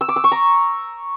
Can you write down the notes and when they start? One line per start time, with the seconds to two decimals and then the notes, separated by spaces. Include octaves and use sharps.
0.01 E6
0.09 D6
0.16 E6
0.24 C#6
0.32 A#5